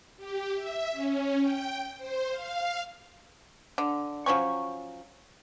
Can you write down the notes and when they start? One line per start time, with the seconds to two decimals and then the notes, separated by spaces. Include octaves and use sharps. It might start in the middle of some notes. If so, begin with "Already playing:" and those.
0.17 G4
0.55 E5
0.92 C#4
1.40 G5
1.97 C5
2.31 F5
3.78 D3
4.26 F3 F#3 C#4 C#6